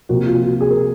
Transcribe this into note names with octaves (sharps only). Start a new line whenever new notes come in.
C3 F3 A#3 F#4
F4
F#4
G#4
A#4